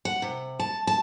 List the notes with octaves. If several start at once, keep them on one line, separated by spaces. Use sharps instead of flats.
F#5
C3
A5
A5